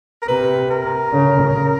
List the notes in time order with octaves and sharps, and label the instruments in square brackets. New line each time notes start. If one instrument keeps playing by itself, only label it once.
[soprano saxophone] A#4
[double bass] C3 [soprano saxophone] B4
[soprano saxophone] A#4
[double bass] C#3
C#3